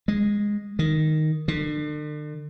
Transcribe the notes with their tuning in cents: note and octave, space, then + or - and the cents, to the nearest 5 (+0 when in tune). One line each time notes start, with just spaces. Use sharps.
G#3 -10
D#3 -5
D3 +40